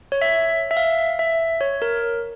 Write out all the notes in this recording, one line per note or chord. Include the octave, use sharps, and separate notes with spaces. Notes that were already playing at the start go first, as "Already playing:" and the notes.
C#5
E5
E5
F5
E5
C#5
A#4